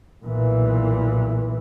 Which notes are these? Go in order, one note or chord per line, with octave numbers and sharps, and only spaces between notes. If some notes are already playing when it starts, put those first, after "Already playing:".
B1 A#2 E3